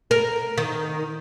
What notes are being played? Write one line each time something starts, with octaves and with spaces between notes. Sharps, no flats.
A#4
D#3